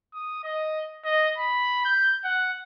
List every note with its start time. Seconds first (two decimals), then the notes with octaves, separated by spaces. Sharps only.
0.14 D#6
0.44 D#5
1.05 D#5
1.38 B5
1.85 G6
2.24 F#5